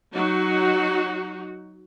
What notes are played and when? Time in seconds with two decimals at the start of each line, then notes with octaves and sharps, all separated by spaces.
0.15 F#3 D#4 F#4